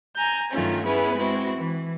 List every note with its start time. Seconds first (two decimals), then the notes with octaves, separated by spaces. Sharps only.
0.16 G#5 A#5 G6
0.51 G2 D#3 F#3 A3 C#4 F4
0.84 B3 C#4 E4 G#4 B4
1.16 G#3 C4 E4 F#4
1.58 E3